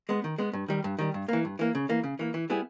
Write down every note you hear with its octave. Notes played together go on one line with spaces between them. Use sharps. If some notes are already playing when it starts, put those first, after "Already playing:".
G#3 B3
D#3
G#3 B3
G2
D#3 G3
G2
D#3 G3
G2
E3 A#3
G2
E3 A#3
C#3
E3 A#3
C#3
E3 A#3
E3
G3 B3 E4 G#4